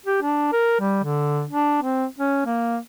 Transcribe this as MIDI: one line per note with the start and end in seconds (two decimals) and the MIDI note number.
0.06 0.19 67
0.22 0.51 62
0.53 0.80 70
0.80 1.01 55
1.04 1.45 50
1.50 1.81 62
1.82 2.06 60
2.19 2.43 61
2.46 2.78 58